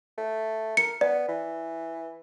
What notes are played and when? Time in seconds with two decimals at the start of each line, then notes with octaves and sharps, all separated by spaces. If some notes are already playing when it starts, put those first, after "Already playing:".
0.18 A3
0.77 A#4 C#7
1.01 B3 D5
1.28 E3